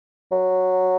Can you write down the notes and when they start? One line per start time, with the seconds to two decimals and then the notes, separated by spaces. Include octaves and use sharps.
0.32 F#3